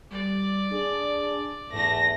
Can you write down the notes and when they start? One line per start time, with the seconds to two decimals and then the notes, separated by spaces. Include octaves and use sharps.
0.11 G3 D5
0.71 D4 G#4
1.72 E2 G#2 A3 A#6